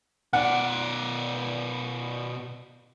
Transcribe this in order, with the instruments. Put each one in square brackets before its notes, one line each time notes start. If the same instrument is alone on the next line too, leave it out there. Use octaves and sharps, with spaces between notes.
[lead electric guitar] B2 D5 [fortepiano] F#5